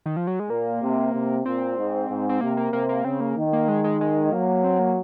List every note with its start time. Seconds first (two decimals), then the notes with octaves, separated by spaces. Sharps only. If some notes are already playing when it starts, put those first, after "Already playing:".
0.06 D#3
0.17 F3
0.27 F#3
0.40 G#3
0.49 A#2 A#3
0.81 C3
1.13 C3
1.45 A#2 C4
1.78 G#2
2.09 G#2
2.29 C4
2.41 C3 A#3
2.57 A#3
2.72 C3 A#3
2.89 A#3
3.05 C#3 C4
3.20 A#3
3.37 D#3
3.53 A#3
3.68 G#3
3.84 G#3
4.01 G#3
4.32 F#3 A#3
4.64 C4
4.79 A#3